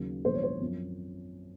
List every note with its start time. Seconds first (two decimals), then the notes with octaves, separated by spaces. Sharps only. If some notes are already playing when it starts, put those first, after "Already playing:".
Already playing: D#2 C#3 F#3 A#3
0.24 A#1 G#2 D#3 F#3 C5
0.34 C#5
0.43 C5
0.61 F#2 F3 C4